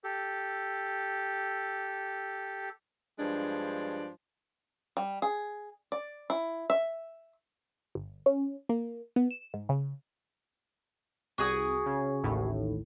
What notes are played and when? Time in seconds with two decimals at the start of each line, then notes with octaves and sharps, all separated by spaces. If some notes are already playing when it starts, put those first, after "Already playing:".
0.04 G4 A4
3.19 G2 F3 G#3 D4
4.97 G3
5.22 G#4
5.92 D5
6.30 E4
6.70 E5
7.95 G1
8.26 C#4
8.69 A#3
9.16 B3
9.31 E7
9.54 G#2
9.69 C#3
11.38 C2 F#4 G#4 D#6
11.86 C#3
12.23 A1 D#2 A2